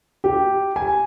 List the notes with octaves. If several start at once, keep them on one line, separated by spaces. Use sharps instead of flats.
G4
G#5